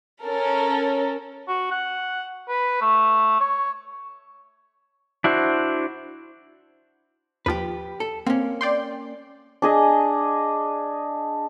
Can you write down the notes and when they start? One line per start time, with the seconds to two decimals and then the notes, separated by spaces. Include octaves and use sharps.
0.24 C#4 A4 A#4
1.48 F#4
1.71 F#5
2.49 B4
2.81 A3
3.40 C#5
5.24 D4 E4 F#4 C5
7.46 D#2 F3 G4 B4
8.00 A4
8.26 A#3 C4 C#4
8.61 D5 G5 C6
9.62 D4 G#4 D#5